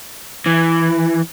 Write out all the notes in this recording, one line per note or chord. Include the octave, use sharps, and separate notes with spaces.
E3